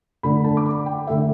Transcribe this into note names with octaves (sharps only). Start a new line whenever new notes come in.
D3 A3 D4 B5
A5
D6
B5
G5
D3 A3 D4 E5